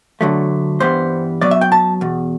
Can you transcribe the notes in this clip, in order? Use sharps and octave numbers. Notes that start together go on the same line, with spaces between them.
D2 D3 F#3 A3
G2 E3 G3 B3 C5
F#2 F#3 B3 D5
E5
G5
A5
E2 B2